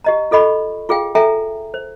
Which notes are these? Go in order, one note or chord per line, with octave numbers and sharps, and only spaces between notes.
G4 D#5 A#5
F4 A4 D#5 B5 C#6
F4 G#4 F5 G5
A4 E5 G5 G#5 A#5
C5